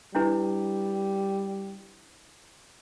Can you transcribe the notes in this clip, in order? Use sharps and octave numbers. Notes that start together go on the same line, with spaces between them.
G3 D4 E4 B4